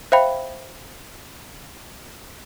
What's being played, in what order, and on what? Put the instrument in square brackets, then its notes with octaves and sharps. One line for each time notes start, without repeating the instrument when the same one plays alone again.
[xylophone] C5 E5 F5 G5 B5